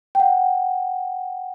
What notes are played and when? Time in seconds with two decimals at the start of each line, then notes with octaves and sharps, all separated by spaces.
0.15 G5
0.20 F#5